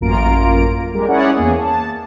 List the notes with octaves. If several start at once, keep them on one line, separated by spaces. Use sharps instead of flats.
A1 F#2 A#3 F4 A#5 D7
G3 G#3 G4 A#4
C#4 E4 G#4 C#5 D5 F#5
E2 A#3 G#4
A5